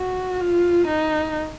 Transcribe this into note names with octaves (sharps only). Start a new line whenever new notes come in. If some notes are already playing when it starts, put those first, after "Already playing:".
Already playing: F#4
F4
D#4